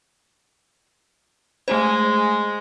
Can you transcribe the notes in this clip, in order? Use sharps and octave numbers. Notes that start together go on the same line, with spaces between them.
G#3 A3 C5